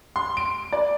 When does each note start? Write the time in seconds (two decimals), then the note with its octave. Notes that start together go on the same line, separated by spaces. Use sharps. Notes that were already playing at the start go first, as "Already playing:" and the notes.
0.16 C6
0.37 D7
0.72 D5